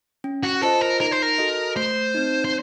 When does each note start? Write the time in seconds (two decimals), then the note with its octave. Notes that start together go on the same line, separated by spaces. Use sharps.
0.24 C#4
0.43 F#4
0.62 F4 A4 C5 D#5
0.81 A#4
1.00 D#4 A#4
1.12 C5
1.22 A#4
1.38 F#4 A4 D#5
1.76 A3 C5
2.14 C4 D#4
2.45 C5